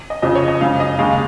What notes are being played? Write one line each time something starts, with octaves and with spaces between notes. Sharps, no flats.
D#5
F2 C#3 F3 D#5
C#5
D#5
F#2 C#3 G#3 F5
D#5
D#2 C#3 G#3 F5